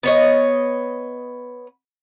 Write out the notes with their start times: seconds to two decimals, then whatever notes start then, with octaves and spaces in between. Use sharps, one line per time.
0.03 B3 C#5 D#5